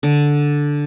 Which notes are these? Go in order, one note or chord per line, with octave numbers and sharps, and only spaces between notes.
D3